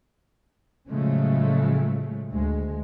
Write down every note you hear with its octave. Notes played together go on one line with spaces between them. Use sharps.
A2 C#3 F3 F#3 G#3 A3
D2 G#3